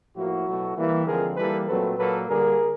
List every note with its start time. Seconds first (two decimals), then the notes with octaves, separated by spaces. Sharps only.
0.16 A2 F3 A#3 E4 F#4
0.47 B2 F#3 A3
0.76 E3 G3 A#3
1.06 D3 F3 G#3 C4 G#4 A#4
1.37 E3 G3 A#3 A4 B4
1.67 A#2 F#3 A3 C4 A4 B4
1.97 A#2 F#3 A#3 A4 B4
2.28 D3 G3 A#3 G#4 A#4